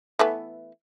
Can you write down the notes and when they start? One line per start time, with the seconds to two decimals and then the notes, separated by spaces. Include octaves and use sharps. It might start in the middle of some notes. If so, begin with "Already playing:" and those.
0.19 E3 A3 B3